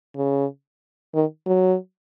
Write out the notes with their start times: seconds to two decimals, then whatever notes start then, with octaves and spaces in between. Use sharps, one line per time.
0.16 C#3
1.14 D#3
1.46 F#3